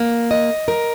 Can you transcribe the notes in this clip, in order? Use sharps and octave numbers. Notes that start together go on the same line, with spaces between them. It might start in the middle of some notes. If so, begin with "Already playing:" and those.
Already playing: A#3
D#5
A#4